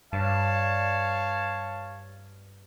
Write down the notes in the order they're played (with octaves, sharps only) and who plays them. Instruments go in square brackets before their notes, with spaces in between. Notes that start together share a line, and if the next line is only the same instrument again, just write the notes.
[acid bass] G2 [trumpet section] C#5 F5 A5